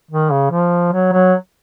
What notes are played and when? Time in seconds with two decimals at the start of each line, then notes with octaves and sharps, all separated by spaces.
0.11 D#3
0.31 C#3
0.51 F3
0.93 F#3
1.13 F#3